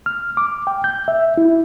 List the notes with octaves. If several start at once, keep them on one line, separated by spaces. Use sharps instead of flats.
F6
D6
G5
G6
E5
E4